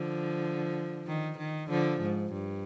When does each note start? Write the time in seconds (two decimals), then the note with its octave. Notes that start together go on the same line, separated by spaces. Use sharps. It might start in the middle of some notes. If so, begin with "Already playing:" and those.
Already playing: D3 F3
1.07 D#3
1.38 D#3
1.70 D3 F3
2.01 G#2
2.33 G2